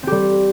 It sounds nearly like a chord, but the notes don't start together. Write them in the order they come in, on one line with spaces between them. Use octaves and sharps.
C4 G4 G3